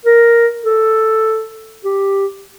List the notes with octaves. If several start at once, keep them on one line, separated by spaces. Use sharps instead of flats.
A#4
A4
G4